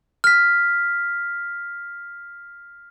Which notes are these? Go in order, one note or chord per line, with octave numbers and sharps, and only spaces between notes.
F6 B6